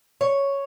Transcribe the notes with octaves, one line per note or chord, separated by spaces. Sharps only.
C#5